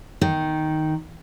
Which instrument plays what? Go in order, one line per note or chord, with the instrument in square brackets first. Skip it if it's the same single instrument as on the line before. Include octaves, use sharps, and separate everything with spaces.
[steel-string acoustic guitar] D#3